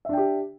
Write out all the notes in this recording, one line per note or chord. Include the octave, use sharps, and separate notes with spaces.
D4 G4 E5 G5